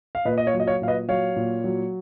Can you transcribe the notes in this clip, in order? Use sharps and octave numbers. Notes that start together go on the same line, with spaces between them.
F5
A#2 B4 D#5
D#5
C#5 F5
F#3
D#5
C#5 F5
A#2 F5
B4 D#5
F#3 C#5 F5
A#2
F#3